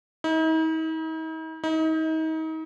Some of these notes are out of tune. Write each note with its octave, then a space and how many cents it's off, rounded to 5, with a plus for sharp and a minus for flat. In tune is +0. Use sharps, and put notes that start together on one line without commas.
D#4 +45
D#4 +35